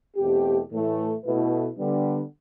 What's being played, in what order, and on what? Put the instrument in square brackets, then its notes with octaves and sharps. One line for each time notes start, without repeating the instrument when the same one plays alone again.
[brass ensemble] E2 B2 A3 C4 G4
A2 E3 A3
B2 A3 E4 B4
D3 G3 B3 D4